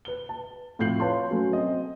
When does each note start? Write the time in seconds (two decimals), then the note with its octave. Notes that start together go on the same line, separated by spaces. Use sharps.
0.05 B4 G7
0.29 A5
0.79 F2 A2 F4 G6 C7 F#7
1.00 B4 C#5 F5 A5 C6
1.31 F#3 A3 C#4
1.53 C4 D#5